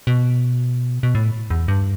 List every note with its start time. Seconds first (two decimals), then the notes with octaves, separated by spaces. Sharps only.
0.07 B2
1.03 B2
1.15 A2
1.50 E2
1.68 G2